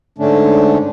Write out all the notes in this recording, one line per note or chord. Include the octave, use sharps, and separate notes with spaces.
G#2 D3 A3 C#4 D4